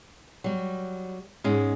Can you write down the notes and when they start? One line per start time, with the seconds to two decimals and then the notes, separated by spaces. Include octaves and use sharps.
0.44 F#3 G3
1.44 G#2 G#3 C#4